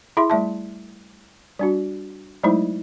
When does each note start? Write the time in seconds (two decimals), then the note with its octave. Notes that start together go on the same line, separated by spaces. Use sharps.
0.17 E4 G#4 E5 C6
0.30 G3 A3 E5 A5
1.59 G3 D4 F#4
2.43 F#3 G#3 A3 D#4 E4 C5